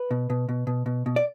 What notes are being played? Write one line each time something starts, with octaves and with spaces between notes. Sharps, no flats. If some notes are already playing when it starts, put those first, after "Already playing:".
Already playing: B4
B2
B2
B2
B2
B2
B2
D5